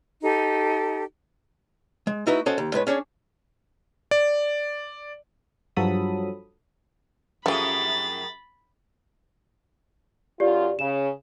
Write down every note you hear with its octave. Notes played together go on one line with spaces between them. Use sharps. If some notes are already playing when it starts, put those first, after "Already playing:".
D#4 G4 A4
G#3
A3 D#4 E4 F#4 B4 D#5
C#4 F#4 A4 C5 D#5
D#2
A2 G#3 B4 C#5
C#4 D4 G#4 C#5
D5
G2 F3 F#3 A4 B5 D#6
F#2 F3 A3 G4 G#4 B5 A6
F#2 F4 G4 D5
C#3 E7